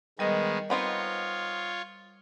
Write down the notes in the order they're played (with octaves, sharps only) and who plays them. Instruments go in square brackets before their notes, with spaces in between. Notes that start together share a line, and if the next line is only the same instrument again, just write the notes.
[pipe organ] D#3 G#3 B3 [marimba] G3 A#4 D#5
[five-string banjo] B3 C4 D#4 [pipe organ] F4 C#5